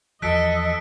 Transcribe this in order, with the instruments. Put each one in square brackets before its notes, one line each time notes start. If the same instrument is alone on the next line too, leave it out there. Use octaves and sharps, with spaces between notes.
[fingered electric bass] E2 F3 [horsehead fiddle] A4 [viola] D#5 [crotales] F#6 B6 D7